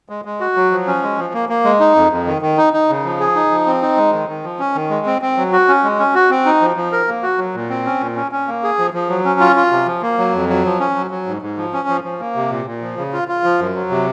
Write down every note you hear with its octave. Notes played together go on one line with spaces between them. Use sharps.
G#3
G#3
F#4
F#3
F3
C#4
G#3
F3
A#3
A#3
G#3
D#4
F2
F2
D#3
D#3
D#4
D#4
C#3
F3
G#4
D#4
F3
C4
D#4
G#3
D#3
D#3
F3
C#4
D#3
G#3
C4
C4
F#3
F#4
C#4
G#3
C#4
F#4
C4
D#4
F3
F3
A#4
A#3
F#4
F#3
A#2
C4
C#4
A#2
C#4
C#4
A#3
G#4
F3
F3
F#3
C#4
F4
F4
C3
F3
A#3
F#3
F2
F#3
F3
C#4
F#3
F#3
G#2
G#2
F3
C#4
F3
F3
A#3
C3
A#2
A#2
F3
C#3
F4
F4
F3
F#2
F#3
C3